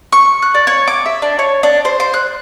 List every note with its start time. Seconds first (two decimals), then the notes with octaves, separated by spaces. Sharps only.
0.12 C#6
0.42 F#6
0.55 D5
0.67 C#5
0.87 D6
1.06 E5
1.22 D4
1.39 C#5
1.63 D4
1.85 C5
2.00 C5
2.14 F#6